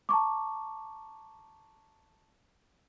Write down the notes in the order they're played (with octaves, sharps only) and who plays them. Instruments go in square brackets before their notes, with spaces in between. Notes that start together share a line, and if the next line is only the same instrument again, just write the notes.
[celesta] A5 A#5 C#6 D6